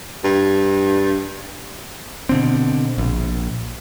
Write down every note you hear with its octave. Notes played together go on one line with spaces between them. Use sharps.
G2
B2 D3 C4
A#1